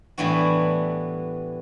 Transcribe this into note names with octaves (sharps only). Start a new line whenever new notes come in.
A2 E3 G3 B3 D4 F#4